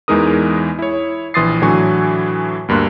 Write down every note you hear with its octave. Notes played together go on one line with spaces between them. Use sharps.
E2 E3 G#3 D#4 A#4 D#6
E4 C#5
A#1 E3 C6 D#6 A6 C7
A2 D3 E3 F#3 G#5 C#6
D2 G2 A#3 C6 F#6